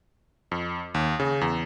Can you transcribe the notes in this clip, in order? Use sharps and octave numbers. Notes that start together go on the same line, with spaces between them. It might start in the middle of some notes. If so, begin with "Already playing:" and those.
F2
D#2
C#3
E2